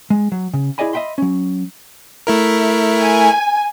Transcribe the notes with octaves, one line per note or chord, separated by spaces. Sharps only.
G#3
F#3
C#3
E4 G#4 D5 D#5 G#5 B5
D#5 E5 G5 B5 C6
F#3 C#4
A3 E4 A#4
G#5